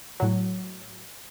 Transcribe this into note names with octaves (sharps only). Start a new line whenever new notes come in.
A2 F#3